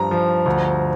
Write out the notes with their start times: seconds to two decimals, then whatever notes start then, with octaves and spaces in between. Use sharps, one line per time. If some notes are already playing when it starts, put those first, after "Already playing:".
Already playing: G2 F3 A#5
0.11 F3
0.46 D2